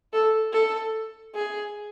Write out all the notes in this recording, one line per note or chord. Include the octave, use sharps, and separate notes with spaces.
A4
A4
G#4